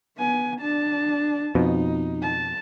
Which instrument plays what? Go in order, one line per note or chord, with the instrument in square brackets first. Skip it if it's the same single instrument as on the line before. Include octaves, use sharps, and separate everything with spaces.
[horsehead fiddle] B3 G#5
D4 A5
[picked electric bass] F2 B2 [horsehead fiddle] D#4
[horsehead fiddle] A5